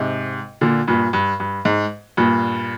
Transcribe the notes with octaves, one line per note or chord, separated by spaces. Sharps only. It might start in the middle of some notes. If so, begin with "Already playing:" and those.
Already playing: G#2 C3
A#2 D3
G2 A#2
G2
G2
G#2
G2 A#2